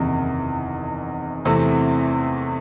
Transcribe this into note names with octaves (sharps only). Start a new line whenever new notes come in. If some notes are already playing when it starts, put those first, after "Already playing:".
Already playing: F#1 E2 C3 D#3
E2 C3 E3 A3 C4